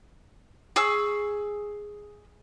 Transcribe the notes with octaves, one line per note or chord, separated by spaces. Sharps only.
G#4 C#6 E6